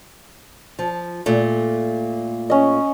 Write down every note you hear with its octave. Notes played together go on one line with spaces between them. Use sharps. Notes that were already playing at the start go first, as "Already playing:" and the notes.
F3
A#2 A3
C#4 D#5